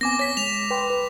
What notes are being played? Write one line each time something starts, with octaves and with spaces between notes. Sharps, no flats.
B3 C4 G#5 D6 A#6
C#5 A#6 B6
G#3 F7
B4 G5 C6
B4